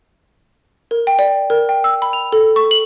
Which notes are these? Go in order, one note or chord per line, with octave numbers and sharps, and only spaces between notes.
A#4
G5
D5
A#4
G5
E6
B5
F7
A4
C#6
F#7